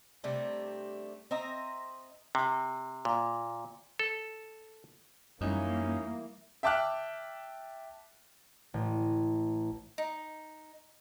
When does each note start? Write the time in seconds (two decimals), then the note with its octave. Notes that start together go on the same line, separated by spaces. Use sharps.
0.24 C3 G3 A3 D4
1.31 C4 D#5 E5 A#5
2.35 C3
3.05 A#2
3.99 A4
5.41 F#2 E3 G3 A#3 C#4 D#4
6.63 E5 G5 A5 D6 F6 F#6
8.74 A1
9.98 D#4